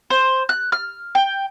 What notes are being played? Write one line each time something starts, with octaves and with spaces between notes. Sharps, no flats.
C5
F#6
F6
G5